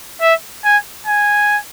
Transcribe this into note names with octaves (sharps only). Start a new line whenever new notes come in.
E5
G#5
G#5